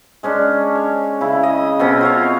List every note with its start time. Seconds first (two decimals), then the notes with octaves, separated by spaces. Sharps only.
0.23 G#3 C#4 D4
0.75 C#5
1.21 C#3 E4
1.43 D#5
1.79 B2 C4 C#4 A4
2.01 F4 C#5 F5